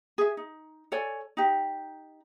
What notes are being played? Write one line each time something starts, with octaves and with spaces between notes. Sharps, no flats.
G#4 E5
D#4
A4 C#5 D5 G#5
D#4 G4